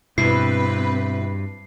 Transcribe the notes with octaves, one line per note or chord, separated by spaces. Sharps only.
G2 B2 C4 E4 B4 C7